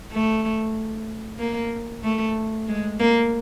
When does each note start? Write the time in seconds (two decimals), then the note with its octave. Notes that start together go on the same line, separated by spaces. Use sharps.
0.12 A3
1.39 A#3
2.04 A3
2.68 G#3
3.00 A#3